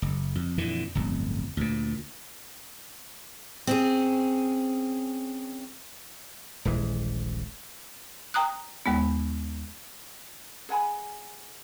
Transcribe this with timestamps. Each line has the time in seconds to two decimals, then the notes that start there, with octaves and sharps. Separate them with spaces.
0.02 F#1
0.35 F2
0.58 F2 A#2 D3 E3
0.95 D1 G1 F2
1.57 D2 A#2
3.67 C4 C#4 G#4
6.65 D#1 A#1 E3 G#3
8.34 G5 A#5 D#6 F#6
8.86 D#2 G#3 B3
10.69 G#4 F#5 G#5 B5